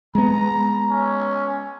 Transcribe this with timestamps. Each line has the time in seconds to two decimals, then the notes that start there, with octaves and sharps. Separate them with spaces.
0.15 G#3 B3 A#5
0.90 C#4